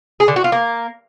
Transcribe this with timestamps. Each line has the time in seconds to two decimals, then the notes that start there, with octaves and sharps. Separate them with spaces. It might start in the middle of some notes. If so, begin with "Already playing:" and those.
0.20 G#4
0.28 D3
0.36 F#4
0.44 F4
0.52 A#3